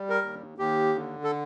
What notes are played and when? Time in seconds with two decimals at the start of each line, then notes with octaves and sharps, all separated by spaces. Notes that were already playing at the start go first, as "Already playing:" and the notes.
Already playing: G3
0.09 A#4
0.22 D#2
0.58 D#2 G4
0.95 D3
1.24 A4